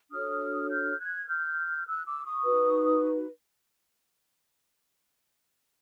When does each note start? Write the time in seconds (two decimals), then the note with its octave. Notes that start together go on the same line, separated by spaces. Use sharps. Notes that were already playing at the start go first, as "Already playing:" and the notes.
0.11 D4 F#4 A4 C#5 D#6 F6
0.69 F6 G6
0.98 F#6 G#6
1.28 F6 G6
1.86 E6 F#6
2.05 D6 E6
2.25 C#6 D#6
2.44 D#4 F#4 B4